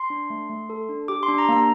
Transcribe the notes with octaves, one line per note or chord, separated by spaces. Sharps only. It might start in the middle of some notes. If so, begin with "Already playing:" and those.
Already playing: C6
D4
A3
A3
A4
D4
G4 D6
C6
D4
A#5
A#3 A#5